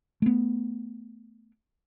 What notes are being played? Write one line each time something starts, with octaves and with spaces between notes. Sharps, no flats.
A3 B3